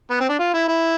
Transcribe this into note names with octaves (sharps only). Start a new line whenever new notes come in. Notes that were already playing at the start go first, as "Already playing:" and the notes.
B3
C4
D4
F4
E4
E4